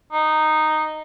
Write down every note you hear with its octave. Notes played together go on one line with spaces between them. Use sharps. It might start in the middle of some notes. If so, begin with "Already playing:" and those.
D#4